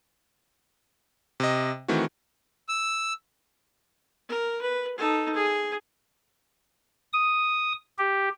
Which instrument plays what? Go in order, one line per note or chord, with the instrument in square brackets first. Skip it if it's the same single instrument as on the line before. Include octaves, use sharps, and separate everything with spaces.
[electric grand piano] C3 D#5
D#3 E3 A3 C4 F#4
[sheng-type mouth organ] E6
[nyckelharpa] A#4
B4
D#4 A4
G#4
[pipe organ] D#6
G4